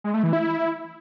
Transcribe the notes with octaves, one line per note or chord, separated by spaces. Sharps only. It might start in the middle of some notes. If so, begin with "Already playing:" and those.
G#3
A3
E3
E4